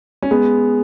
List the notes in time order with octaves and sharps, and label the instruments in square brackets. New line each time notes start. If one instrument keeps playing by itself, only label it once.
[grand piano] C#4
G#3 B3